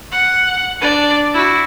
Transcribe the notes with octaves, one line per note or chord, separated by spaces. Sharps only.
F#5
D4 D5
E4 F#4